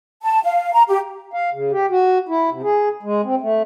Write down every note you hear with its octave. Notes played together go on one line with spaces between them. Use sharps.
A5
F5
A#5
G4
F5
C#3
G4
F#4
E4
C3
G#4
G#3
C4
A3